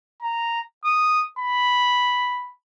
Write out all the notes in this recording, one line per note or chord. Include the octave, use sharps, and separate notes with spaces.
A#5
D#6
B5